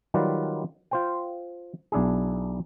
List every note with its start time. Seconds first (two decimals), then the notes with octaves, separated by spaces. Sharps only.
0.14 D#3 F#3 G3 F4 B4 D5
0.91 F4 C5 G5
1.92 B1 D4 E4 G#4